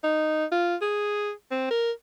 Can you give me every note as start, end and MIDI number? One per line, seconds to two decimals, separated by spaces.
0.04 0.45 63
0.52 0.76 65
0.82 1.32 68
1.51 1.67 60
1.71 1.92 70